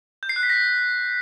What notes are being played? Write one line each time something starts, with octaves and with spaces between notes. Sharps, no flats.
G6
C7
F#6
B6
A#6